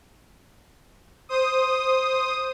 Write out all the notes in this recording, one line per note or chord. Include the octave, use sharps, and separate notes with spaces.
C5 D#6